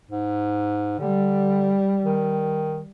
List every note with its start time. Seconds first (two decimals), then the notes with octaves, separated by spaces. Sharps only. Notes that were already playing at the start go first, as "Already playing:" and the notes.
0.11 G#2
0.99 D3 G3
2.05 D#3